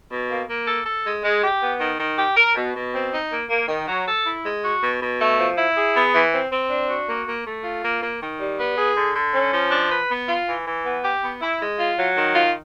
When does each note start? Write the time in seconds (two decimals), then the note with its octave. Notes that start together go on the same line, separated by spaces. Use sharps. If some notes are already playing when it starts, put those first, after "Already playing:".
0.10 B2
0.29 A#3
0.48 A#3
0.67 A4
0.85 A4
1.05 G#3
1.23 G#3
1.42 G4
1.61 B3
1.79 D#3
1.98 D#3
2.18 G4
2.36 A#4
2.55 B2
2.75 B2
2.93 C4
3.12 D#4
3.31 A#3
3.49 A#3
3.68 D#3
3.87 F#3
4.07 A4
4.25 E4
4.44 G#3
4.62 F#4
4.82 B2
5.00 B2
5.19 A3
5.38 F3
5.57 E4
5.76 G#4
5.95 B3
6.14 E3
6.32 C4
6.51 C4
6.69 D4
6.89 F#4
7.07 A#3
7.26 A#3
7.45 A3
7.64 F4
7.83 A#3
8.01 A#3
8.21 D#3
8.40 G3
8.58 B3
8.77 G#4
8.96 D3
9.16 D3
9.33 C#4
9.52 F3
9.71 D4
9.90 B4
10.09 B3
10.28 F4
10.47 E3
10.65 E3
10.85 B3
11.03 G4
11.23 B3
11.41 E4
11.60 G#3
11.79 F4
11.98 F#3
12.16 D#3
12.35 F4